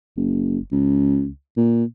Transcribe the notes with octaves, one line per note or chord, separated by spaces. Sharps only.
F#1
C#2
A#2